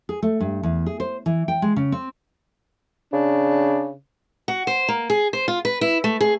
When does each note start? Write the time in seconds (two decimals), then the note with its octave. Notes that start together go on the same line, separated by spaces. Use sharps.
0.09 G#4
0.22 A3
0.40 G2
0.63 E2
0.86 G#4
1.00 C5
1.26 E3
1.48 G5
1.62 G#3
1.76 C#3
1.92 C4
3.13 C#3 D4
4.48 F#4
4.67 C5
4.88 A#3
5.10 G#4
5.33 C5
5.48 F4
5.65 B4
5.81 E4
6.04 A3
6.21 G#4